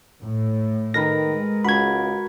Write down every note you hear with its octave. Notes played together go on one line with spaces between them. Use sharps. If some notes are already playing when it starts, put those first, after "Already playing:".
A2
D#3 A#4 B4 B5 A#6
G#3
C#2 F#4 B5 G#6